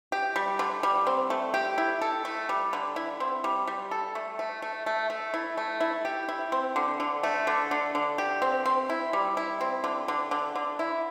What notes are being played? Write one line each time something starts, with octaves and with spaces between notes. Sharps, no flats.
G4
G3
D3
G3
C4
A3
G4
E4
A4
A3
G3
D3
E4
C4
G3
G3
A4
A3
A3
A3
A3
A3
E4
A3
E4
G4
E4
C4
D3
D3
A3
D3
D3
D3
G4
C4
C4
E4
G3
E4
C4
D3
D3
D3
D3
E4